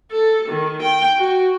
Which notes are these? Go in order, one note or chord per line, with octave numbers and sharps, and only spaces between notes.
A4
D#3
G5
F#4